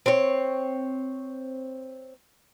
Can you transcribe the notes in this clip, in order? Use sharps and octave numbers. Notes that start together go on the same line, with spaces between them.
C4 C#5